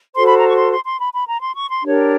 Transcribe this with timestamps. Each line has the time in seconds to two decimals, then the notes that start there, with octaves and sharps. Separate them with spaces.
0.16 F#4 A4 C5 C6
0.26 B5
0.37 A#5
0.47 C#6
0.57 C6
0.71 C6
0.85 C6
0.99 B5
1.13 B5
1.27 A#5
1.40 C6
1.55 C#6
1.69 C6
1.82 D4 G4 A#4 C#5